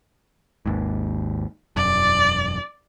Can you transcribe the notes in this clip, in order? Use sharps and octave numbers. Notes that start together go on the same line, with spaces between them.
G#1 D#2 G#2
E1 F#2 D5